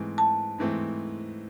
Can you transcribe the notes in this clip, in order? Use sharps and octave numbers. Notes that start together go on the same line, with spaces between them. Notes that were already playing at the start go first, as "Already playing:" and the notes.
Already playing: G#2 E3 A3 C4
A5
G#2 E3 A3 C4